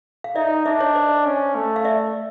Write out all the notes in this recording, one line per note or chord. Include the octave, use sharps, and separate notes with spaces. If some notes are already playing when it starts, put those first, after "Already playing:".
F5
D#4 D5 E5
D4 D5 E5
C#5 D#5
C5 D5
C#4
A3
F5
D5 E5